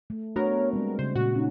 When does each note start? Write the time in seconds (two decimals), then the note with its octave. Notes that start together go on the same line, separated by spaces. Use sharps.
0.10 A3
0.36 A3 B3 D4 F#4 A#4 C#5
0.73 G3 G#3 C4
0.99 C#3 C5
1.15 A#2 F#4
1.35 C#4 D#4